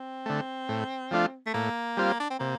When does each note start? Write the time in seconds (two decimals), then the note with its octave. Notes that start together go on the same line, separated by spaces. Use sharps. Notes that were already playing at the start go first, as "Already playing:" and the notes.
Already playing: C4
0.26 D3 A3
0.69 A2
1.11 F3 A3 D4 F4
1.46 A3
1.54 A2 A#3
1.97 G3 C4 F4
2.20 D4
2.30 C4
2.39 C3 A#3